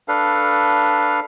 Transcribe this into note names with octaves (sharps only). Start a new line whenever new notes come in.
D4 A4 B4 F5